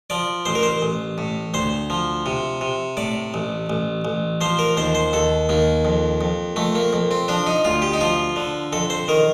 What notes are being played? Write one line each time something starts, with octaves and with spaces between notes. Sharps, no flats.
F3 D5
A1 C5
A#4
C5
A1
A2
D2 C5
F3
C3
C3
A2 D5
A1
A1
A1
F3 C5
A#4
D#2 C5
C5
D#2 A4
D#2 A#3
F2
F2
F2 A3
A#3
F2
C4
F3 D4
D#4
D2 F4
G4
D#4
F3 F4
D3
F2 A4
C5
D#3 A#4